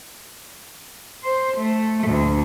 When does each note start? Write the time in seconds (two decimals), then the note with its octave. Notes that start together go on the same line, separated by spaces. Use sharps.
1.23 C5
1.57 A3
2.08 D2